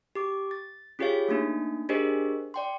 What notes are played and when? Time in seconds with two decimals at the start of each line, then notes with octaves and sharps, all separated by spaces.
0.15 G4 D6
0.51 A6
0.99 C#4 F4 G4 G#4 C#5 F5
1.28 A3 A#3 D4 D#4
1.89 D4 G4 G#4 A#4 C5 D#5
2.54 D5 G5 C6